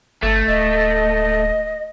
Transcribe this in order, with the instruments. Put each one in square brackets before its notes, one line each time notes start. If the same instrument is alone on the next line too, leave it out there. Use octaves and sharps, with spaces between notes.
[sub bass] G1 [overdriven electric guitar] A3
[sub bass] D1 [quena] D#5